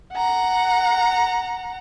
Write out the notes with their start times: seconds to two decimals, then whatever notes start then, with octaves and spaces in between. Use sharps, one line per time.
0.13 F#5 A#5